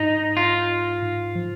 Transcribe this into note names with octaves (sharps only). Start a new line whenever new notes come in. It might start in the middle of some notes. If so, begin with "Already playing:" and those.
Already playing: G#2 D#4
F4
G#2
F3